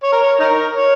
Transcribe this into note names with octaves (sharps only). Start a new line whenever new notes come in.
C#5
A#4
C#5
D#4 A#4
C#5